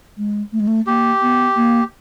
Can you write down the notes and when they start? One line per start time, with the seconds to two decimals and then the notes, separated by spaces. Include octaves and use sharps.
0.17 G#3
0.52 A3
0.60 G#3
0.67 A3
0.87 A#3 G4
1.22 B3
1.56 A#3